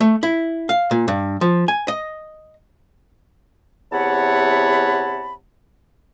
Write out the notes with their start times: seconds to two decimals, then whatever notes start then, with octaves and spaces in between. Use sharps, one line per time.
0.01 A3
0.23 E4
0.69 F5
0.91 A#2
1.08 G2
1.41 F3
1.68 G#5
1.88 D#5
3.92 E2 C3 C#5 F#5 A5 B5